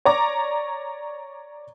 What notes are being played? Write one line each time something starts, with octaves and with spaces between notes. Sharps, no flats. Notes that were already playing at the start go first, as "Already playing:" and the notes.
C#5 D5 A#5 D6